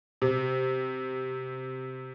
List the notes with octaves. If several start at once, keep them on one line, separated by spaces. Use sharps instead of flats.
C3